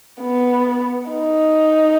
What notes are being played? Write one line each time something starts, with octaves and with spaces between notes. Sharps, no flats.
B3
D#4